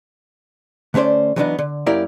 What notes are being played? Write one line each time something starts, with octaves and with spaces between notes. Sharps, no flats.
D3 A3 C#4 C5 D5
E3 F#3 A#3 B3 D4 D#4
D3
F#2 A#3 E4 G4 A#4 D5